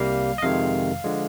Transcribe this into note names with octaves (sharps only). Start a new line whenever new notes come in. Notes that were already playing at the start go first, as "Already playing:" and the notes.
Already playing: C2 C3 G3 A#3 F5
D#5
F2 C3 D#3 G#3 F5
D3 F3 G#3